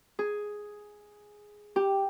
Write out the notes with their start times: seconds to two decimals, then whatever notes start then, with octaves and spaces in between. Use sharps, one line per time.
0.19 G#4
1.76 G4